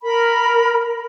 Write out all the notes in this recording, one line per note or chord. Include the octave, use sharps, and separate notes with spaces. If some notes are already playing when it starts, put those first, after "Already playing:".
A#4 B5